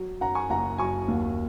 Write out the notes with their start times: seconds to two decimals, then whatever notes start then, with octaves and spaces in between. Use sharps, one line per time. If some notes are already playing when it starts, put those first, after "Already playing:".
Already playing: F#3
0.21 F#2 F#5 A#5
0.35 G#5 C#6
0.50 F#1 F#5 A#5
0.78 F#3 G#5 C#6
1.08 D#2